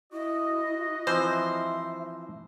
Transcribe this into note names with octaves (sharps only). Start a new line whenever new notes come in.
E4 F#4 D#5
E3 F3 C4 C5
E5